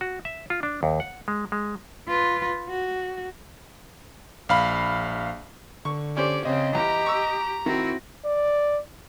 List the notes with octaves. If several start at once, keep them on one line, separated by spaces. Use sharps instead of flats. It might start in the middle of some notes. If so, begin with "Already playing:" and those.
F#4
E5
F4
D4
D#2
F#5
G#3
G#3
F4 B4
F#4
A#1 F5 B5
D3 C#6
C#4 G4 C5 D5
C#3 C4 D#5
E2 G4 A#5
C#6 E6
D#3 C4 E4 F#4
D5